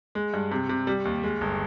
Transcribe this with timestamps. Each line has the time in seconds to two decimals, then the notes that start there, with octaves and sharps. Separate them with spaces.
0.15 G#3
0.33 G2
0.51 C3
0.69 C3
0.87 G3
1.05 D#2
1.23 G#3
1.41 G1